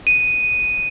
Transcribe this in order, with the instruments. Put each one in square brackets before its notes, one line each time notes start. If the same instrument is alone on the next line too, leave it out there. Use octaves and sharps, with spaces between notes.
[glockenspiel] D#7